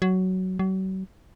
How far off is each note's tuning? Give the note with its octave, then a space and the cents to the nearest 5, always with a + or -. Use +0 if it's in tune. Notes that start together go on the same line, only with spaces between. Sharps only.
F#3 +10
F#3 +40